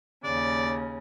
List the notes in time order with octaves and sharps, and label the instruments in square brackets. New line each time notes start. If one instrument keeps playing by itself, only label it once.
[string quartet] D#2 C#3 [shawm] D5